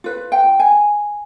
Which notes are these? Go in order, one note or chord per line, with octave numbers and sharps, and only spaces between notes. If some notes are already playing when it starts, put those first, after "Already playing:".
F4 B4
G5
G#5